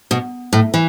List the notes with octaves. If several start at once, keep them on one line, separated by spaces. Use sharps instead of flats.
B2
A2
E3